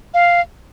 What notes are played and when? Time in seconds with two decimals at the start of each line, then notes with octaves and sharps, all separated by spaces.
0.14 F5